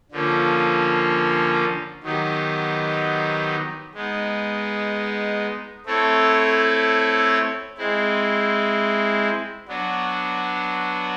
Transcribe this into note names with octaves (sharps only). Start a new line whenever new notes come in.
D3 F3 A#3 C#4
D#3 F#3 B3 D#4 G4
G#3 B3 D#4
A3 C4 E4 A4 C#5
G#3 C4 E4
F#3 B3 D4 F#4